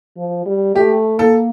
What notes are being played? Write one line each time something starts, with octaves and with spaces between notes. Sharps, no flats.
F3
G3
A3 G4
A#3 A4